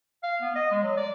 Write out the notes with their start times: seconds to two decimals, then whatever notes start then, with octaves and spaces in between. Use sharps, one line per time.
0.23 F5
0.41 B3
0.55 D#5
0.71 G#3
0.83 F#3
0.97 D5